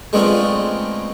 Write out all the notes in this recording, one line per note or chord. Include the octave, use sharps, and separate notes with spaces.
G#3 A3 B3 C4 D4 F4